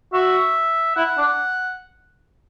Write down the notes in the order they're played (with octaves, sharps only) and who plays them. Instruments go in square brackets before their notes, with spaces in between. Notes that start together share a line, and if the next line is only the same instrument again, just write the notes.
[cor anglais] F#4 [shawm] E5
[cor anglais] E4 [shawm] F#5
[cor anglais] D4